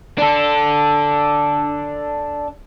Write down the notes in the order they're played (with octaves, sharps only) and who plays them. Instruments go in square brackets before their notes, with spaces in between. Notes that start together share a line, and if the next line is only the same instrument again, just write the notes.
[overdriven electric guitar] D4 A4